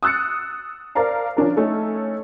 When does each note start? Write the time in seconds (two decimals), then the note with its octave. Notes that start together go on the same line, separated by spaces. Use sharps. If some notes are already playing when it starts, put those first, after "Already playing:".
0.03 D#6 E6 F#6 A6 C#7
0.95 A#4 C5 D5 F5 A#5
1.37 F3 C#4 D4 A#4
1.57 A3 C#4 D#4 A4